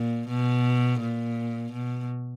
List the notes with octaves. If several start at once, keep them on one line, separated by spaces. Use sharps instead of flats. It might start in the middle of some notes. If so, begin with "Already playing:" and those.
Already playing: A#2
B2
A#2
B2